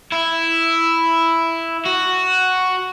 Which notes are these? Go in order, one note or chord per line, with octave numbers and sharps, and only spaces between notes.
E4
F#4